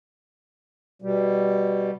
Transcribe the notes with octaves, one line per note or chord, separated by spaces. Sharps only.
B2 G3